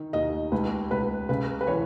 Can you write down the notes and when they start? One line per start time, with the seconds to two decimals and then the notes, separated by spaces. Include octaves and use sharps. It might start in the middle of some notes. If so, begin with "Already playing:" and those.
Already playing: D#3
0.13 D#2 D#5
0.52 C#2 B4
0.91 C#2 B4
1.29 C#3 B4
1.61 B4
1.67 E3 C#5